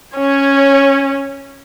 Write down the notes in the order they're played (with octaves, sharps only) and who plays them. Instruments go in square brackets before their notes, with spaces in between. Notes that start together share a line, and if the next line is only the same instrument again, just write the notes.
[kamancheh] C#4 C#5